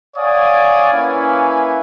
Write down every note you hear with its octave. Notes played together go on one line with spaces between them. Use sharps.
C#5 D5 F5 F#5 G#5 D#6
A#3 C#4 E4 B4 F5 G#5